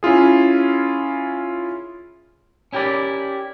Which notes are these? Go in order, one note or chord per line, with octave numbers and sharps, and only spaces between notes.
C#4 E4 F4 G#4
C#4 E4 G4 A#4 D5